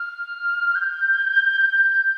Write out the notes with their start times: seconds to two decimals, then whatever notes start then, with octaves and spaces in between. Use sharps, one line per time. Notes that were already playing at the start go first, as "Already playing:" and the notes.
Already playing: F6
0.75 G6